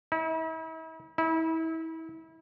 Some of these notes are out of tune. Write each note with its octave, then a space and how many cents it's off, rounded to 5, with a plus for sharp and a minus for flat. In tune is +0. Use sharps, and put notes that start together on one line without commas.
E4 -40
E4 -30